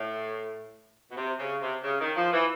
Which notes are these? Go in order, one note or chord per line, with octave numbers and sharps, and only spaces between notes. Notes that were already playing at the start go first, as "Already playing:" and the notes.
Already playing: A2
B2
C3
C#3
C3
C#3
D#3
F3
E3